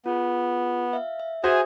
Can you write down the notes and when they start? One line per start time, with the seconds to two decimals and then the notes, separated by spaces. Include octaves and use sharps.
0.06 B3 F4 G#4
0.93 E5 F5
1.20 E5
1.44 F#4 G#4 C5 E5 G#5 D#6 G#6